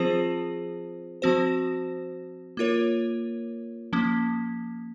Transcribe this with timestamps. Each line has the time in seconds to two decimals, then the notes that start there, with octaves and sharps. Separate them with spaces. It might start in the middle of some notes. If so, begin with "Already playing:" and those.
Already playing: F3 C4 F4 G#4 C5
1.22 F3 C4 F#4 C5
2.57 A#3 F4 A#4 C#5
3.93 F3 A#3 C#4